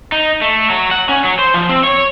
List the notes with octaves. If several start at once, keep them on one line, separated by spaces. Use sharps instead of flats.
D#4
A3
F#3
F#5
C#4
F#3
C5
F3
C4
C#5